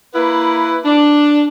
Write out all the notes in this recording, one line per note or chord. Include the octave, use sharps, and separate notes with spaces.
A#3 E4 B4
D4